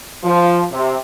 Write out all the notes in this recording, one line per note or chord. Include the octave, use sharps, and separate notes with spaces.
F3
C3